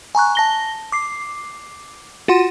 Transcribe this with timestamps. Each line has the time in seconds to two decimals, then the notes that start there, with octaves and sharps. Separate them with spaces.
0.15 G#5 A#5 C#6 F#6
0.35 A5 A#6 G7
0.92 D6 C7
2.28 F4 F#4 F#5 C6